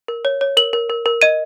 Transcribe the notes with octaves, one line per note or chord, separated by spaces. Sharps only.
A#4
C#5
C#5
A#4 F#7
A#4
A#4
A#4
D#5 D#7